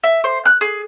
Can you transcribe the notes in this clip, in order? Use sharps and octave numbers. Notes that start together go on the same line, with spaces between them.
E5
C5
F#6
G#4